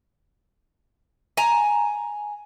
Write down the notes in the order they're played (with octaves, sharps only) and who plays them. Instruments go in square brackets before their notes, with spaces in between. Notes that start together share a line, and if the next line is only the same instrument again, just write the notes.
[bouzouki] G#5 A#5